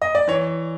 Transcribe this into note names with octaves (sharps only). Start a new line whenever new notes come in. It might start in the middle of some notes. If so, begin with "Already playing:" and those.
D#5
D5
E3 C#5